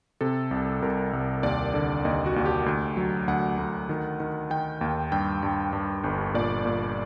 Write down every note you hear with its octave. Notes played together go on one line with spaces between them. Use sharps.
C3 A4
C2
C2 A#4
C2
D#2 D5
D3
D#2 D#5
F#4
D#2
G4
D2
F#3
D2 F#5
D2
D#3
D#3
D#3 G5
D#2
G2 G5
G2
G2
G1
A#2 D5
A#2